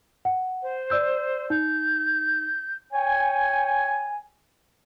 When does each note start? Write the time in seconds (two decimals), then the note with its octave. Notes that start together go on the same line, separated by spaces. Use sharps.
0.25 F#5
0.63 C5
0.90 D5 E6 G6
1.50 D#4 G6
2.90 C#5 G5 G#5